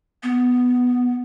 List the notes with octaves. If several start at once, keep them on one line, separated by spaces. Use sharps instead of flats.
B3